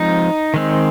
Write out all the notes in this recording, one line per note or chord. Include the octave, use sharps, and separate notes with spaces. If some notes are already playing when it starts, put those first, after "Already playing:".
Already playing: F3 G#3 C4 D#4
D#3 G#3 C4